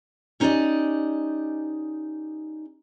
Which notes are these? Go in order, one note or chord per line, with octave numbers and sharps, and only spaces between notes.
C#4 D#4 G4 C5 D5 D#5